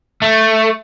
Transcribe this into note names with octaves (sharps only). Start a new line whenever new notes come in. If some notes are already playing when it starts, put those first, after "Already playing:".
A3